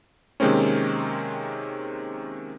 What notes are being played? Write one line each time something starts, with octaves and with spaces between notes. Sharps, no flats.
C3 D#3 G#3 A#3 C4 C#4